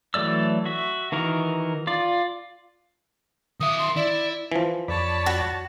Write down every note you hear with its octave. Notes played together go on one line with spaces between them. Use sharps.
E3 F#3 A3 D5 E6
F#4 E5
D#3 E3 F#4 A#4
F4 D5
D#3 E5 D#6
C6
E4 D5
E3 F3
F2 C#5 D5 A5 B5
F#4